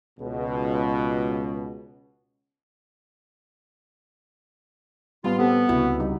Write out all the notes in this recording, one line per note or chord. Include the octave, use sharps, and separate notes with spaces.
C#2 B2
A1 G3 B3 F4
B3 C4 G4 A4
C#2 C3 E4 F#4
G3 D#4